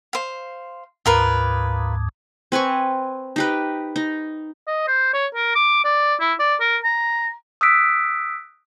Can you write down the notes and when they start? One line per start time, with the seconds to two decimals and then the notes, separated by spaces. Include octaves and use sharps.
0.13 C5 F5
1.06 D2 G#2 F4 A#4 B4
2.52 C4 B4 G#5 C#6
3.36 D#4 G4 B4
3.96 D#4
4.67 D#5
4.87 C5
5.14 C#5
5.35 A#4
5.55 D6
5.84 D5
6.20 E4
6.39 D5
6.60 A#4
6.84 A#5
7.61 D#6 E6 F#6 G6 B6 D7